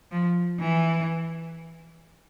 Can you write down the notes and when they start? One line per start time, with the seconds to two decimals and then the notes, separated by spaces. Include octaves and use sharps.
0.11 F3
0.60 E3